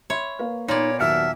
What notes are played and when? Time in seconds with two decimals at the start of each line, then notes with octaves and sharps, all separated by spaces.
0.10 C#5 E5 B5 C6
0.39 A#3 B4 F5
0.68 A#2 B3 D#4 C#5 D5 B5 C6
1.00 D#2 F#3 B3 E5 F#5 A5 F6